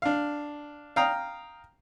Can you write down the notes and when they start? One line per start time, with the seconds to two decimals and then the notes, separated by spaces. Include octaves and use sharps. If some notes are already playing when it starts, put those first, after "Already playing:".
0.02 D4 F5
0.96 F5 G5 A#5 D#6